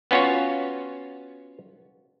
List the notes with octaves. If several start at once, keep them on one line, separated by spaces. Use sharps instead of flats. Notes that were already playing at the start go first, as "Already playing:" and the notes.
B3 C#4 F4 F#4 C#5